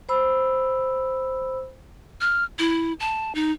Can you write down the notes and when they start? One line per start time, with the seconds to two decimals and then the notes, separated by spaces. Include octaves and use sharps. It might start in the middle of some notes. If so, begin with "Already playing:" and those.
0.09 C5 B5 E6
2.21 F6
2.59 E4
3.00 A5
3.35 D#4